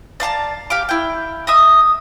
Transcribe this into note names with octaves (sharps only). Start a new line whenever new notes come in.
D5 F5 A5 A#5
G4 F5 D6
E4 G5
D#5 E5 D#6